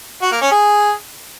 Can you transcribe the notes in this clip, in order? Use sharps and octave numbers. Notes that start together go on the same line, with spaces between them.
F#4
A#3
C#4
G#4